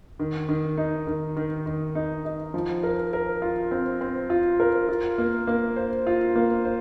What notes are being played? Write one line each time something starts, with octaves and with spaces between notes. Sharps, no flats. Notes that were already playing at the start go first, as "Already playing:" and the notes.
D#3
D#3
D#4
D#3
D#3
D#3
D#4
D#4
F3
A#4
A#4
F4
C4
C4
F4
A#4
F4
A#3
A#3
C5
F4
A#3
C5